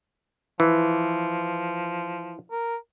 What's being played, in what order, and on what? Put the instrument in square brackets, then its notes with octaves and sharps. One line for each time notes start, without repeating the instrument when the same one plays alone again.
[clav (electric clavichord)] E3 [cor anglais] F3
[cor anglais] A#4